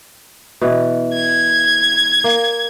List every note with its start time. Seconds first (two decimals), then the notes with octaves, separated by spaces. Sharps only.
0.61 B2 E3
1.13 G#6
2.24 A#3